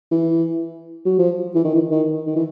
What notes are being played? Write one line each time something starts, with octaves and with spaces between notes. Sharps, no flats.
E3
F#3
F3
E3
D#3
E3
D#3
D#3
E3